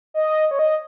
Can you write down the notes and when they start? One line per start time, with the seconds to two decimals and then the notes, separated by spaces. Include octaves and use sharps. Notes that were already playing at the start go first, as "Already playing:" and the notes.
0.14 D#5
0.51 C#5
0.59 D#5